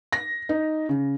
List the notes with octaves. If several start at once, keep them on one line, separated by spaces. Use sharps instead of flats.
A#6
D#4
C#3